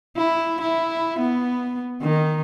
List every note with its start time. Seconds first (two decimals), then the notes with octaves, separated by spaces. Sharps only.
0.17 E4
0.61 E4
1.19 B3
2.02 D#3